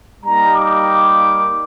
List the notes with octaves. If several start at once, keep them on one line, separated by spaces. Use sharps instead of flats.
G3 A#3 D#4 G4 A#5
D6